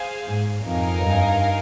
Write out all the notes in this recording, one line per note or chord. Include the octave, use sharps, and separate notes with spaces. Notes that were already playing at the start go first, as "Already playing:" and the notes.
Already playing: G#4 C5 F5 G#5
G#2
F2 D#4 A#4 F5 G#5
G2